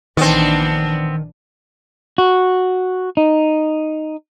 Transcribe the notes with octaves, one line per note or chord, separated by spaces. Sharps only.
A#1 D#3 E3 B3 C4 D4
F#4
D#4